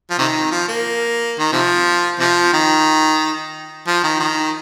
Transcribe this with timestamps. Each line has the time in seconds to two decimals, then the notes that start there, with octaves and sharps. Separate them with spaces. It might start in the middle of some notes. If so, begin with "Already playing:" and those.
0.10 F3
0.19 C3 D#3
0.51 F3
0.68 A#3
1.39 D#3
1.52 C3 F3
2.19 C3 F3
2.53 D#3
3.87 F3
4.03 D#3
4.20 D#3